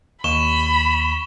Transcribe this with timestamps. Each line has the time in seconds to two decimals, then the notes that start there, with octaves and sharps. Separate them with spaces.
0.24 D#2 B5 C#6 E7 G7